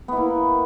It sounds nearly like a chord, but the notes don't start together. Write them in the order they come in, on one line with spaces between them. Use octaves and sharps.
B3 E4 A#3